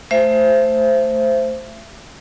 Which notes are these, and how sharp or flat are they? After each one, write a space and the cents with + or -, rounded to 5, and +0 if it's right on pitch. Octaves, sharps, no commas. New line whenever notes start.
A3 +0 C5 +0 E5 +30